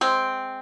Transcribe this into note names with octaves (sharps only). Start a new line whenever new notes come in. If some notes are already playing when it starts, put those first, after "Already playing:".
G#3 C4